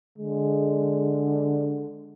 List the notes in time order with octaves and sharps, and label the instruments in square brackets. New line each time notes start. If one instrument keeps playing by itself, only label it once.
[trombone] D3 [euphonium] G#3